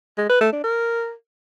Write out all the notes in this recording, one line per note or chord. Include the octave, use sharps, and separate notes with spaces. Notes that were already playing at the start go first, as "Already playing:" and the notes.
G#3
B4
A3
D4
A#4